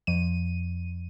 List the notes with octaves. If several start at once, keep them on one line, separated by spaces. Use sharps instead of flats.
F2 D#7